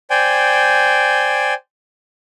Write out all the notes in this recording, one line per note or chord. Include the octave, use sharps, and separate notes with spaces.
C5 D5 G5 G#5